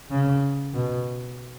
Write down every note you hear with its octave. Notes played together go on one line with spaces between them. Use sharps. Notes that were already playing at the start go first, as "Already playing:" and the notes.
C#3
B2